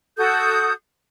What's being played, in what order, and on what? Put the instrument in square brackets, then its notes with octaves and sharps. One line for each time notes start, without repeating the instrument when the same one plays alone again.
[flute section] F#4 A4 D#6 G6